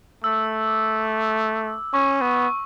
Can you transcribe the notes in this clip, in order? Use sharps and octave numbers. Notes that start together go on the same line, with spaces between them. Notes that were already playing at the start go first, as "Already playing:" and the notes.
A3 E6
D6
C#4 C#6
B3